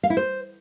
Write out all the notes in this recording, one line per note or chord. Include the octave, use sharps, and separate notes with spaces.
F5
E4
C5